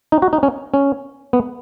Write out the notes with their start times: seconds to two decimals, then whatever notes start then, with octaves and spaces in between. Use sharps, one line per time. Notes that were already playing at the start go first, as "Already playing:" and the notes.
0.12 D#4
0.22 F#4
0.33 D#4
0.43 C#4
0.74 C#4
1.33 B3